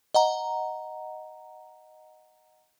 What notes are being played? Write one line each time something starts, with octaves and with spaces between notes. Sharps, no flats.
D#5 F#5 A#5